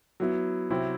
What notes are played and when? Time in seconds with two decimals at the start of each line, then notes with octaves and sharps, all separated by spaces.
0.20 F#3 B3 E4
0.70 C3 F#3 C4 E4